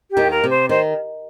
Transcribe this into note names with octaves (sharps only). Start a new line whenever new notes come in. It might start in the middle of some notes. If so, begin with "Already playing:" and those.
G4
D#2 D#3
A#4
C3
C5
D#3 C5